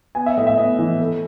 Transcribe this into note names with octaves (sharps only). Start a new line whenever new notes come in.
B3 G#5
E5
A2 D#5
E5
B3 D#5
E3
A3